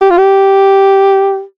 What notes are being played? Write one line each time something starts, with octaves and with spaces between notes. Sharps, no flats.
G4
F4
G4